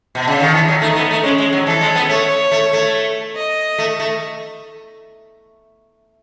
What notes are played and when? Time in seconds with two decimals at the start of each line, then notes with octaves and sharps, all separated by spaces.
0.15 B2
0.28 C#3
0.39 D#3 A4
0.54 E3
0.68 F#3
0.81 A3 D#4
0.96 B3
1.11 A3
1.24 G#3 C#4
1.38 G#3
1.53 F#3
1.66 E3 A4
1.81 G#3
1.95 B3
2.09 A3 C#5
2.52 A3
2.73 A3
3.36 D#5
3.78 A3
4.00 A3